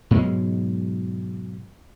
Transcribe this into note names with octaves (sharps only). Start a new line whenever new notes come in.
G#2 B2 F#3 G#3